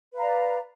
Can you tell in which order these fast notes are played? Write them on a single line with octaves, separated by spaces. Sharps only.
B4 F5 A#5 D5